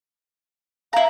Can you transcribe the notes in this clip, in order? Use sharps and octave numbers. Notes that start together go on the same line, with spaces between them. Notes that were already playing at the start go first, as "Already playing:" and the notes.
E4 F5 A#5